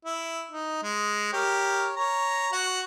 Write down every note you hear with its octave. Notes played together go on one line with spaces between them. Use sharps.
E4
D#4
G#3
G4 A#4 C#5
C#5 A#5
F#4 F#5